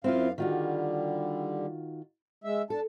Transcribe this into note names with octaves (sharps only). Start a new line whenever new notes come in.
F#2 C4 E4 F4 F5
D3 D#3 G3 F4 F#4
G#3 E5
D4 A4 A5